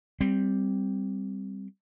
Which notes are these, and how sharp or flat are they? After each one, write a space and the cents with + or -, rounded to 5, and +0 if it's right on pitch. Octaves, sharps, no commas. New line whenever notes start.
G3 +0 C4 +0